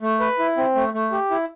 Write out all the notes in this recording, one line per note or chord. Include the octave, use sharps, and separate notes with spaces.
A3
B4
E4
C4
A3
A3
G4
E4